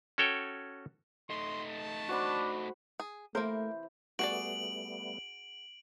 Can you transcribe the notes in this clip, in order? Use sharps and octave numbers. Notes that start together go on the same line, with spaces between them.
C#4 F#4 A4 C#5 G5
A3 D#4 C6
A5
D4 F#4 C5 B5
G#4
C3 E3 A3 A#3 A#4 C5
G3 A3 B3 F#4 G#4 D5 D7 F#7